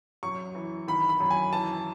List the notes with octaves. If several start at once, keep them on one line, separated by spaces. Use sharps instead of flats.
F#2 C#6
E3
D#3 B5
B5
F#2
G#5
E3 A5